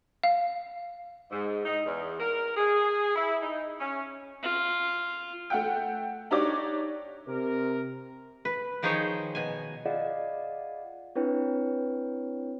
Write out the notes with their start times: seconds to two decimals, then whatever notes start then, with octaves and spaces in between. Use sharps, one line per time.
0.23 F5
1.31 G#2
1.65 D#4
1.86 E2
2.20 A#4
2.57 G#4
3.16 E4
3.43 D#4
3.80 C#4
4.43 F4
5.50 A3 F#5 G5
6.31 D4 D#4 G4 C#5 D6
7.27 C3 A#4
8.45 B4
8.82 D#3 F3 D#4 G#4 C5 C#5
9.35 B2 G#5
9.85 F4 G#4 D5 D#5 F5 F#5
11.15 C4 D4 E4 B4 C#5 G5